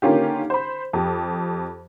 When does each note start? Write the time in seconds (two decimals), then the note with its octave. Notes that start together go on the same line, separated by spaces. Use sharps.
0.02 D3 D#3 A#3 C#4 F4 G4
0.50 C5 B5
0.93 F2 G4